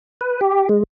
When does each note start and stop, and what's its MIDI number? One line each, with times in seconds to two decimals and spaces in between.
0.21 0.40 71
0.41 0.69 67
0.69 0.83 56